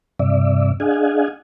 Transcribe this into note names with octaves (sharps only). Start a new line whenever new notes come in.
G2 C3 D5 E5
D4 G#4 D#5 F5 F#5 G#5